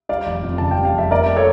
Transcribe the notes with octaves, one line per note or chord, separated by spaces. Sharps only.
G3 D5 F5
F1
F2
C#3 A5
G5
G3
F5
F1 E5
A#3 A#4 D5
A4 C#5